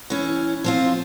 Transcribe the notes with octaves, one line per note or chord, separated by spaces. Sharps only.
E3 C#4
F3 C4 F4